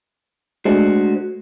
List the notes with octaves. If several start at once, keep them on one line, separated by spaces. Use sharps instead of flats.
G#3 A3 D4 F#4 C5